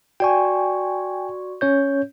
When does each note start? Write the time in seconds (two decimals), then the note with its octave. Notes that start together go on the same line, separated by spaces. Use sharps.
0.20 F#4 D5 G5 G#5 C#6
1.61 C#4 C#5 G6